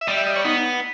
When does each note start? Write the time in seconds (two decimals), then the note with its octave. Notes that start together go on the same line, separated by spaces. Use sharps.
0.01 E5
0.07 G3 D#5
0.17 E5
0.26 D#5
0.36 C#5
0.44 B3 D#4